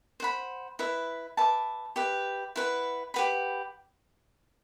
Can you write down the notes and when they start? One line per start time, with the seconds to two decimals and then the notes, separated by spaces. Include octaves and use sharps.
0.20 C5 F#5 B5
0.79 E4 B4 E5
1.37 B4 E5 A5 D6
1.96 G4 B4 E5
2.56 E4 B4 F#5
3.14 G4 B4 F#5 B5